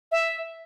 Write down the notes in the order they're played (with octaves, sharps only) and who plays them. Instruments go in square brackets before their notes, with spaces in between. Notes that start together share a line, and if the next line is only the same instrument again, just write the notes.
[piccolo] E5